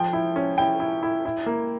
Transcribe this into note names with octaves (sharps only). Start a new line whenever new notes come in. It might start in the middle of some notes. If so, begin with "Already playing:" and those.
Already playing: F3 G5
E4
C#4
E4 G5
E4
E4
E4
A#3